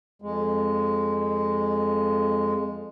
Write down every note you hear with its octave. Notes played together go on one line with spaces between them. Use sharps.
F2 G#3